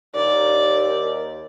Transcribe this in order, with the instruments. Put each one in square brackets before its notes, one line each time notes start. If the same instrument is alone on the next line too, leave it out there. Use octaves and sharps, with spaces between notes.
[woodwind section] D#2 [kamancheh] D5